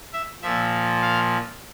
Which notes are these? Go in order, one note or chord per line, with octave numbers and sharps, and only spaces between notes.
E5
A#2 F3 E5
F5